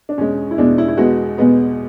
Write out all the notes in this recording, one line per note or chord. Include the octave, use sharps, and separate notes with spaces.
D4
E2 B2 G#3 C#4
E4
E2 B2 G#3 D4
E4
E4
E2 B2 G#3 B3 F#4
E2 B2 G#3 B3